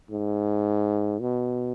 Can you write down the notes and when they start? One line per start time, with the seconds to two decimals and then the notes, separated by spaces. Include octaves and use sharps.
0.11 G#2
1.21 B2